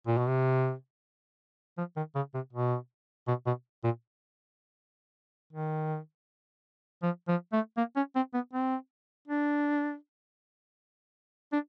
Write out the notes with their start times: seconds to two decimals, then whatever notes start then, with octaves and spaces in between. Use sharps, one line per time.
0.07 A#2
0.18 B2
0.28 C3
1.78 F3
1.96 D#3
2.15 C#3
2.34 C3
2.53 B2
3.28 B2
3.46 B2
3.84 A#2
5.53 D#3
7.02 F3
7.28 F3
7.52 A3
7.77 A#3
7.96 C#4
8.16 C4
8.34 B3
8.53 C4
9.28 D4
11.53 D4